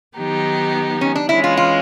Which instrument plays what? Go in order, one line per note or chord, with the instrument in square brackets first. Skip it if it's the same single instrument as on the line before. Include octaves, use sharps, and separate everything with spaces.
[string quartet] D#3 F#3 B3 D#4 G4
[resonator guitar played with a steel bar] C#4
D4
[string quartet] E3 G#3 C#4 [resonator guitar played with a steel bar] E4
[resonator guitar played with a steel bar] F4
F4